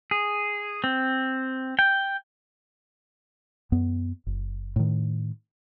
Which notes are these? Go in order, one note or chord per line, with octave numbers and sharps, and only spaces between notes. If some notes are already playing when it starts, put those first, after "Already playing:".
G#4
C4
G5
F#2 B3
F#1
A2 D#3